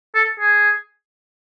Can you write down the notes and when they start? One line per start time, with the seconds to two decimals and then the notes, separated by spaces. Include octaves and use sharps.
0.15 A4
0.40 G#4